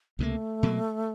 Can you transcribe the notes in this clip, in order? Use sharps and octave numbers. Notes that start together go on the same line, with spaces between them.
C#2 C3 F3 A3 A#3
B2 F#3 A#3